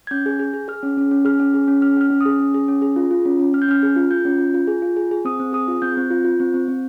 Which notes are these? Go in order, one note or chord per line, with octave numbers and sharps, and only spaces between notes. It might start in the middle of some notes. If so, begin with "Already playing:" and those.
G#6
C#4 G6
G#4
G#4
G#4
G#4 F6
C#4
C#4
C#4
G#4 F6
C#4
G#4
C#4
C#4 F6
C#4 F6
C#4
D#6
G#4
C#4
G#4
C#4
G#4
F4
F4
C#4
C#4
C#4 F6
G6
C#4 F6
G#4
F4
F4 G6
C#4
F4
F4
G#4
F4
G#4
G#4
C4 D#6
C4
G#4 D#6
F4
C4 G6
C4
F4
F4
C4
C4
C4